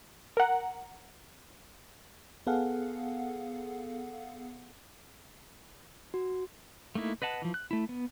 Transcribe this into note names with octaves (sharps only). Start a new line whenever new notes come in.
A#4 F#5
B3 G#4 A4 F5 F#5
F#4
A3 A#3 D#4 E4
B4 D#5 F#5 A5
E3 F3
F#6
A3 E4
B3